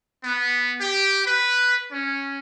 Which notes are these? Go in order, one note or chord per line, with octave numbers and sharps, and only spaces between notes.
B3
G4
B4
C#4